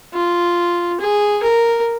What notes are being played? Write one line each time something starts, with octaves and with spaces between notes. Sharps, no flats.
F4
G#4
A#4